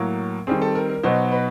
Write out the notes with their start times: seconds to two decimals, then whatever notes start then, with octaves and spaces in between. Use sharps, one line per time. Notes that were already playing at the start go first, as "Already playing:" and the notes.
Already playing: A2 F#3 A#3
0.47 D#3 G3 C4 G#4
0.62 A4
0.75 A#4
0.90 A#4
1.03 B2 F#3 B3 D#4 F#4 C5
1.32 B4